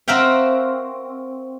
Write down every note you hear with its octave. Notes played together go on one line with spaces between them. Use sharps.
C4 F#4 A#4 E5 F5 G5